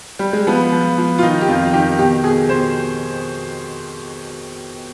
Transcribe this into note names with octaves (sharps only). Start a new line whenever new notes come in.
G3
G#3
F3 B3
F3
F3
F4
D#3 D#4
G4
F2 F4
D#3 G4
B2 G4
B2 G#4
B2 C5